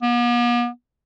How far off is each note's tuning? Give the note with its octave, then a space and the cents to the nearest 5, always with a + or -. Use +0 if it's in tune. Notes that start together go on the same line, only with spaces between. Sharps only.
B3 -45